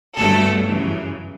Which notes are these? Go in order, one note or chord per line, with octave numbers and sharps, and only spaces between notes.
G1 G2 F#3 A3 A4
F#2 C#3 E3